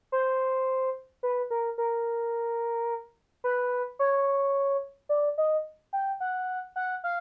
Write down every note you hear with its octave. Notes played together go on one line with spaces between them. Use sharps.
C5
B4
A#4
A#4
B4
C#5
D5
D#5
G5
F#5
F#5
F5